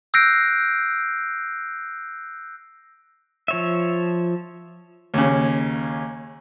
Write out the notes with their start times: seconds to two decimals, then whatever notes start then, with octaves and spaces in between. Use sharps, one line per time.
0.14 E6 F#6 G6 A#6 C7 D7
3.48 F3 C#5 E5
5.14 D#2 C#3